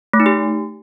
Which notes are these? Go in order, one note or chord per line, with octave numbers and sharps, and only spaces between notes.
A3
D#4
G4